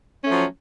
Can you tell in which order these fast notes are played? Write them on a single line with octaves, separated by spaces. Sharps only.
C#4 A3 F3 F#3